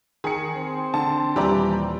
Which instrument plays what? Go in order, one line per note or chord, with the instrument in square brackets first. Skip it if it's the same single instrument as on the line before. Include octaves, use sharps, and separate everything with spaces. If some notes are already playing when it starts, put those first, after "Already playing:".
[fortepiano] D#3 [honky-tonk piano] G#4 C#7
[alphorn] C4
[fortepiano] D3 [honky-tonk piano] A5
[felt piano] D#1 G3 [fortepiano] E3 [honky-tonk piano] G4 D5 A#5